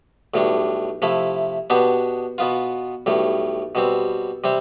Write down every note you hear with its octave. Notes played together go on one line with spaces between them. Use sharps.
B1 A2 G3 D4
C3 F3 A3 E4
B2 B3 D4 G4
B2 B3 F4
B1 A2 G3
B2 G3 C4
C3 G3 C4